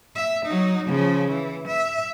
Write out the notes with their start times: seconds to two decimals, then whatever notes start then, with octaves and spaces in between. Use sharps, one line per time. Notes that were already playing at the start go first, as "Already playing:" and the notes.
0.16 E5
0.46 F#3 D#4
0.87 C#3 F3
1.28 E3
1.67 E5